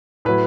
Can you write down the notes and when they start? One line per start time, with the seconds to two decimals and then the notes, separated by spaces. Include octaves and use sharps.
0.25 A2 F#3 B4